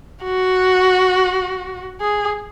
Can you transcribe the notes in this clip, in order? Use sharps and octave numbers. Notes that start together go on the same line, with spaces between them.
F#4
G#4